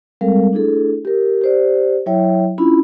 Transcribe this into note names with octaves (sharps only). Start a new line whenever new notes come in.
G3 G#3 C4 A4 A#4 F5
A3 D4 E4 G#4 A4
G4 A#4
G4 C5 D5
F#3 E4 C#5 E5 G5
C#4 D4 E4 F4 B5